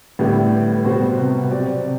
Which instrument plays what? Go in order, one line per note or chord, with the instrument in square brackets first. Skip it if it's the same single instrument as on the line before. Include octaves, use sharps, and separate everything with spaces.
[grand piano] A2 [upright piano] D3 G3 B3 E4 G4
[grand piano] B2 [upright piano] G3 B3 F#4 C5
[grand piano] C3
[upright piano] F#3 C4 G4 D5
[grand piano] C3